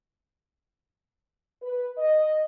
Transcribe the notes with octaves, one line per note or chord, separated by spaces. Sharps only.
B4
D#5